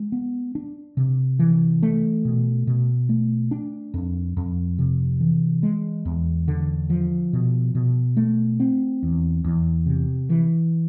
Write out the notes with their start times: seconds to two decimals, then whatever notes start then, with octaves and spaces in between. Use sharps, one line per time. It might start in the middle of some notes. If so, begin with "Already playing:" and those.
Already playing: G#3
0.12 B3
0.55 D4
0.97 C3
1.39 E3
1.83 A3
2.25 B2
2.67 B2
3.09 A3
3.51 D4
3.94 F2
4.37 F2
4.79 C3
5.21 E3
5.63 G#3
6.05 E2
6.48 D3
6.90 F3
7.33 B2
7.75 B2
8.17 A3
8.60 C4
9.03 E2
9.44 E2
9.86 C3
10.30 E3